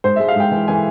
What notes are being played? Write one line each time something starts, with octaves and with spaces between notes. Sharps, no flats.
G#2 C5
G#3 E5
F5
G#2 G5
E3
E3 G#5